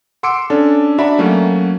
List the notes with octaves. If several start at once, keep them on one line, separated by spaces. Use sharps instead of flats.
F#5 C6 D6 E6 C#7 D7
C#4 D4 A4
D4 F#4 D5 E5 A#5 B5
F#3 A3 A#3 C#4 F#4